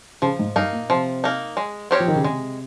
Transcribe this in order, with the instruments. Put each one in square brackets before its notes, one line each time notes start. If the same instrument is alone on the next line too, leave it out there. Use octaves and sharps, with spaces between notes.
[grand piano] C#3 [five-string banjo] F3
[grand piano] G#2
[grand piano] G2 [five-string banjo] A#3 D#4
[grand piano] A#2
[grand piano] C3 [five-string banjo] F3
[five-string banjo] A#3 D#4
G#3
C4 G4 A#4 C#5
[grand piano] F3
D#3
C#3
[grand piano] C3 [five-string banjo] G#3